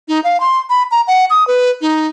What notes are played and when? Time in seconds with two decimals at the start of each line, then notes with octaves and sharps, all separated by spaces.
0.08 D#4
0.24 F5
0.40 C6
0.70 B5
0.91 A#5
1.07 F#5
1.30 D#6
1.47 B4
1.81 D#4